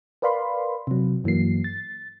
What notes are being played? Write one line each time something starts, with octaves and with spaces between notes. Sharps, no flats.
A#4 B4 D5 F5 B5 C6
C3 F#3
G2 E3 F#3 A#3 C7
A6